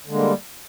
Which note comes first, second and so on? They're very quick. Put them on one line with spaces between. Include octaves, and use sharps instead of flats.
D3 G#3 A#3 G3